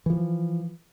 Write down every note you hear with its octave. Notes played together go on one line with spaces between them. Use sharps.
E3 F3